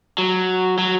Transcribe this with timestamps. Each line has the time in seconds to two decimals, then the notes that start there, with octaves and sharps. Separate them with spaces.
0.18 F#3
0.78 F#3